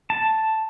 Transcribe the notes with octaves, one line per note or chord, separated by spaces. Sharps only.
A5